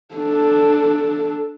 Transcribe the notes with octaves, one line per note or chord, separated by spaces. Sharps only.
D4 A4